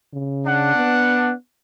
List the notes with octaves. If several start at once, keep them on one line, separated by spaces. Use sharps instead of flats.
C#3
D4 F#5
B3